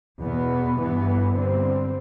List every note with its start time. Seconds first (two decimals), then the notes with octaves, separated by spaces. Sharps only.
0.21 E2 B2 B3
0.78 G2 E3 B3
1.34 G2 D3 G3 C4